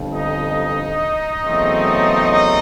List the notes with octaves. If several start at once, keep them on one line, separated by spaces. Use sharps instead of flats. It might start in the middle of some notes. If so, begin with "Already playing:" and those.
Already playing: G1 F2 D3
D#4 D#5
E2 C#3 F#3 A3 C4
D#4 D#5